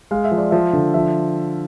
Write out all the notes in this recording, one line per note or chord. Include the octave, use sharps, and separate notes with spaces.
G#3 F5
E5
F3
D5
F3 E5
D3
F3 E5